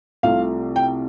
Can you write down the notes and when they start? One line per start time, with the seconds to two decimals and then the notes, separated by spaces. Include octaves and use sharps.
0.23 C2 C3 A3 F4 F5
0.76 G5